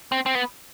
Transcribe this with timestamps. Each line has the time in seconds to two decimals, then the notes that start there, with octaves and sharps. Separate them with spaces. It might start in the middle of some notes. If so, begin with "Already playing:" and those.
0.12 C4
0.26 C4
0.35 B3